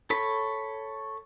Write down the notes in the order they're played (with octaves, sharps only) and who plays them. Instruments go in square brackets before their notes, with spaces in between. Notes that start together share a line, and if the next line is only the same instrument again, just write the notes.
[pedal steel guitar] A4 C#5 B5